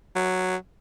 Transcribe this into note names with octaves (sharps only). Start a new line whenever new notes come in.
F#3